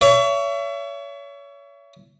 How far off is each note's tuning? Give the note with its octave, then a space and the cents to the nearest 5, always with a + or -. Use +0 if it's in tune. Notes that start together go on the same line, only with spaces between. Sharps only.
C#5 +30 E5 +30